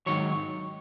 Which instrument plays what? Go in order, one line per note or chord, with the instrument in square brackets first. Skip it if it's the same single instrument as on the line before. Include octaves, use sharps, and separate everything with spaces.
[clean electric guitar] G#2 D#3 F#3 C#5